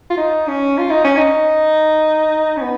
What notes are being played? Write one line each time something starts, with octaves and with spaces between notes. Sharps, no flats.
F4
D#4
C#4
F4
D#4
C#4
D#4
C#4
B3